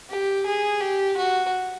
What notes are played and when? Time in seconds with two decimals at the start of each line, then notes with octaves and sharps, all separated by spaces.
0.10 G4
0.46 G#4
0.81 G4
1.17 F#4